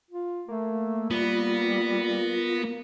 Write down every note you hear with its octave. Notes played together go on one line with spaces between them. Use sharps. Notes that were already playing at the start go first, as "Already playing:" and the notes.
F4
A3 A#3
G3 B3 F4 A#6